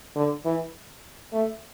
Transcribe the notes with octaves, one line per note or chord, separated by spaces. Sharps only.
D3
E3
A3